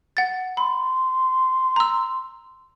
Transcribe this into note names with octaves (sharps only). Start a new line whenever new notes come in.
F#5 A6
B5 C6
A#5 E6